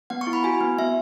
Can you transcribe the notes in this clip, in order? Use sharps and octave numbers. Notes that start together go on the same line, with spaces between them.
B3 F#5
C#6
E4
B5
F#4 G#5
B3
B3 E5